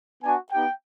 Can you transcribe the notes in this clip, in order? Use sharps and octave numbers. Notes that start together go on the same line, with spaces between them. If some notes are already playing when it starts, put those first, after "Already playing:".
B3 D4 F#4 G#5
B3 D#4 G4 G5